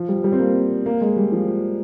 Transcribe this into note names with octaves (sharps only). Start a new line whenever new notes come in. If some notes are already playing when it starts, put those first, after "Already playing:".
Already playing: F3
G3
G3
C4
A#3
A#3
G#3
G3
F3